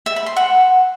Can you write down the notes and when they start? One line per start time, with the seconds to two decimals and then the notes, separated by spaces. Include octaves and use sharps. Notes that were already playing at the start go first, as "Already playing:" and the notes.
0.06 E5
0.16 B5
0.26 C6
0.36 F#5